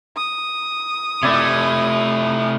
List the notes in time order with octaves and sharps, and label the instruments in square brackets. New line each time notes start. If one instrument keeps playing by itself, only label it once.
[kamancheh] D#6
[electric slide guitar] C3 A3 [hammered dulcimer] E4 D5